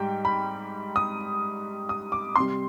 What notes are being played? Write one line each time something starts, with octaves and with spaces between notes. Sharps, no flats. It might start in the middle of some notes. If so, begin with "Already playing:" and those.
Already playing: G#2 G3 G5
B5
D#6
D#6
D6
C3 G3 C6